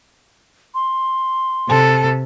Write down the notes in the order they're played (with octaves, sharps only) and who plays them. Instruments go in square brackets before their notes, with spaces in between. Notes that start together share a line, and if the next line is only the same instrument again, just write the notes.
[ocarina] C6
[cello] C3 [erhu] A4